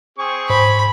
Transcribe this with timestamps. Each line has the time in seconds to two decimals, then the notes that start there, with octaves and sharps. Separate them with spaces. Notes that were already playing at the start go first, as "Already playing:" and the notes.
0.19 C4 G#4 C#6
0.50 G#2 C5 B5